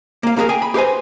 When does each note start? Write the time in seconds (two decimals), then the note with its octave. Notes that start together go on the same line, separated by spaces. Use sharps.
0.23 A#3 F5
0.36 A#3 F4 F#4 G#4 A#4
0.49 G#4 G5 G#5
0.62 B5
0.74 G4 G#4 B4 C5 G#5